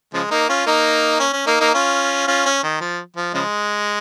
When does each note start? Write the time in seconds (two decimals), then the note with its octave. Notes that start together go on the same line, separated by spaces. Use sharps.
0.14 C#3 F3 G#3
0.31 A#3 D#4
0.49 C#4 F4
0.66 A#3 D#4
1.20 C#4
1.33 C#4
1.47 A#3 D#4
1.60 A#3 D#4
1.74 C#4 F4
2.27 C#4 F4
2.46 C#4
2.63 D#3
2.81 F3
3.16 F3
3.34 C#3 F3 G#3